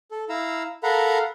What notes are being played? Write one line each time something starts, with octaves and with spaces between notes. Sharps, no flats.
A4
E4 F5 A#5 E6
A4 A#4 F5 F#5 A#5 B5